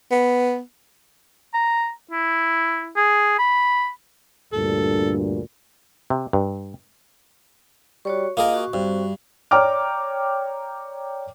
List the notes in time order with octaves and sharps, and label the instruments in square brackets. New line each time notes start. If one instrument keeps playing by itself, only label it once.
[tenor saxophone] B3
[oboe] A#5
E4
G#4
B5
[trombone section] D2 G2 A#2 [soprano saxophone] A4
[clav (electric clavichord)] C3
G2
[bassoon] G3 [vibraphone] F#4 C#5 C#6
[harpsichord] A#3 G#4 A#4 [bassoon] F4 [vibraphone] D#5 F5
[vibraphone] F#4 C#6
[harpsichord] G2 [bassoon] C4
[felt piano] C#5 D5 G5 A#5 D6 F6